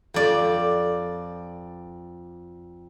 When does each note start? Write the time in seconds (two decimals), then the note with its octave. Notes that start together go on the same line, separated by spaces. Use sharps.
0.14 F2 D5